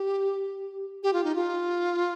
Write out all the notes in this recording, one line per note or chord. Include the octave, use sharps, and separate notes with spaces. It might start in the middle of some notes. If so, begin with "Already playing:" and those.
Already playing: G4
G4
F4
D#4
F4